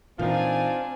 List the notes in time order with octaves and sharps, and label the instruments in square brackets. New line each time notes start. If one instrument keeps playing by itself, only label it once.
[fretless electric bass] A#2 E3 [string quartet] C4 D4 G#5 [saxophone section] D#4 F4